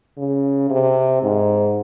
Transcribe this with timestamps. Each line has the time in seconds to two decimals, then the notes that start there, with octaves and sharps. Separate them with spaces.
0.18 C#3
0.70 C3
1.23 G#2